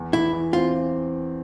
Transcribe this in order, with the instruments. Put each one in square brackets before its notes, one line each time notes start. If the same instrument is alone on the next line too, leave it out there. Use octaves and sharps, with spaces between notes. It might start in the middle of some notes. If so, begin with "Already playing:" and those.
Already playing: [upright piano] E2
[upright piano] E2 [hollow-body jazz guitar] E4
[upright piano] E3
[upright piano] C4 [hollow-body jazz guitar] F4